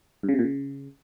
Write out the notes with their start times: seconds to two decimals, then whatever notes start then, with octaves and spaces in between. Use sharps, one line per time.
0.23 G2
0.29 C#3
0.34 C3
0.39 A#2
0.44 C#3